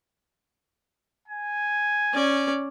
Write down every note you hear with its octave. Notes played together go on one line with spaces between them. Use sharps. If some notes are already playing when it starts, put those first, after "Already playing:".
G#5
C#4 D5